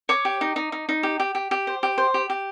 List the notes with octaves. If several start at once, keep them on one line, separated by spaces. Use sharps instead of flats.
C#5 D6
G4
D#4
D#4
D#4
D#4
G4
G4
G4
G4
C5
G4
C5
G4
G4